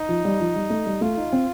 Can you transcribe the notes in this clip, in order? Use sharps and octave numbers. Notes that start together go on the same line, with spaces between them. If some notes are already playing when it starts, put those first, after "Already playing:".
Already playing: D#4
F3
G3
F3
G3
A3
G3
A3 F4
D#4
C4